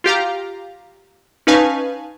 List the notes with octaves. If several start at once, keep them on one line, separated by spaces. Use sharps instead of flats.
F4 G4 F5 A#5
C#4 D#4 B4 F5 G#5 A5